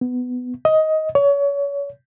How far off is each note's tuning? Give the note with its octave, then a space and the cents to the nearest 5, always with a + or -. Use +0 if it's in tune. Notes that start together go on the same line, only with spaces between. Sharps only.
B3 +15
D#5 +15
C#5 +30